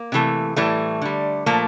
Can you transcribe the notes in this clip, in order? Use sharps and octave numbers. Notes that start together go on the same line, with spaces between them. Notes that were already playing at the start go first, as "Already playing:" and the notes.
Already playing: A#3
C3 E3 A3
A2 E3 G3 A3
D3 G3
A#2 F3 A3 A#3